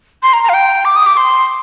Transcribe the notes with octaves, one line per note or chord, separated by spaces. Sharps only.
C6
A#5
A#5
F5
G5
D6
D#6
D6
C6